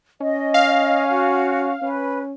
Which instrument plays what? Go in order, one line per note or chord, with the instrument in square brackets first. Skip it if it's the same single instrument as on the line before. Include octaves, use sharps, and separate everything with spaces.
[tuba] C#4 [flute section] D#5
[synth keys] F5
[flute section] F#4
[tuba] C#4 [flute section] B4